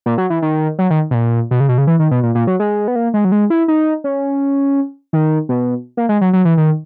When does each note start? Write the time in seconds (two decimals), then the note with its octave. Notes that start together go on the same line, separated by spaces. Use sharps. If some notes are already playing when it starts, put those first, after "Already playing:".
0.06 A#2
0.18 F#3
0.30 E3
0.42 D#3
0.79 F#3
0.90 D#3
1.11 B2
1.14 A#2
1.51 B2
1.60 C#3
1.69 B2
1.78 C#3
1.87 E3
1.99 D#3
2.11 B2
2.23 A#2
2.35 A#2
2.47 F#3
2.60 G#3
2.88 B3
2.96 A#3
3.14 G#3
3.25 F#3
3.32 G#3
3.50 E4
3.68 D#4
4.04 C#4
5.13 D#3
5.49 B2
5.97 A#3
6.09 G#3
6.21 F#3
6.33 F#3
6.45 E3
6.57 D#3